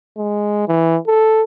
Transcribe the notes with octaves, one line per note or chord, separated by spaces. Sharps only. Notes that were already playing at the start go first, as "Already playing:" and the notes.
G#3
E3
A4